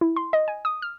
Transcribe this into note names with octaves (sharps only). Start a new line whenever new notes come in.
E4
C6
D#5
G#5
D#6
F6